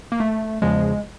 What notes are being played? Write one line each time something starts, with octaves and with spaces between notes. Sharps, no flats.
A#3
A3
E2 C#3 F3 G#3